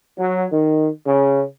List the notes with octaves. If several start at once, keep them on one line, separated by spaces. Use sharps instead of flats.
F#3
D#3
C#3